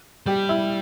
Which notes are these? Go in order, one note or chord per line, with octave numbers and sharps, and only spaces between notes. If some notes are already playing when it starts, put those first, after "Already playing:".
G3 G4
E4